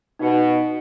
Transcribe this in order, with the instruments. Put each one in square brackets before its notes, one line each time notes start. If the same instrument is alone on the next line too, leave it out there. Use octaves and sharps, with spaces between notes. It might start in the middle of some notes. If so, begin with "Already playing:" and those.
[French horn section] B2 [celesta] D#4 C#7